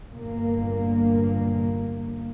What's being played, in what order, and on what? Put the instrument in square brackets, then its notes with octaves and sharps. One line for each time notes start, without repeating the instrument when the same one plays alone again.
[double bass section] G1 A#2 A#3